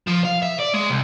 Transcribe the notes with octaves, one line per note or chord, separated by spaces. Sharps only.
F3
F5
E5
D5
G#3
C2